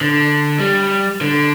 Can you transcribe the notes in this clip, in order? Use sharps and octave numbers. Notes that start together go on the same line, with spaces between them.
D3
G3
D3